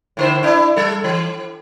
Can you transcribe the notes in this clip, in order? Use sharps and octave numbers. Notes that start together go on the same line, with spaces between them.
A2 D3 C5
D4 E4
G3 A4
E3